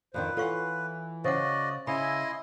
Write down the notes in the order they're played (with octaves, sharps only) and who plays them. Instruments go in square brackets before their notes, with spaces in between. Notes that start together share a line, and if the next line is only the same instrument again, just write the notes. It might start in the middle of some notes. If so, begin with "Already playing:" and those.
[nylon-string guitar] F2 D3 D#3 [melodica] B4 [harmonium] C5
[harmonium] E3 [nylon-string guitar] F4 F#5 [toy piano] A4 C#5 C#6
[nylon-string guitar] C#3 [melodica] F#4 D5 D#5 [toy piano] C5 F#5
[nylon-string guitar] C#3 [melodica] E4 D#5 C6 [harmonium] E5 G#5 [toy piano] B5